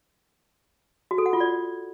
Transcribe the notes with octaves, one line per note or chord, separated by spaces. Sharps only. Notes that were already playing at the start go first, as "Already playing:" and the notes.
F#4
A4
F#5
F4
D5